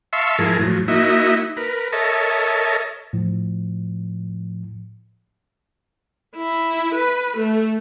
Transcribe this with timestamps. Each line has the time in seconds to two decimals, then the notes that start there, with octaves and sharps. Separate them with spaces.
0.13 E5 F5 A5 C6 C#6 E6
0.38 G#2 F3 E4 G#4 A#4 A5
0.60 A2 F3 F#3
0.88 A#3 D#4 E4 F#4 D#5 E5
1.57 A#4 B4
1.92 A4 A#4 C#5 D#5 E5 A5
3.13 A2 F3
6.36 E4
6.95 B4
7.37 A3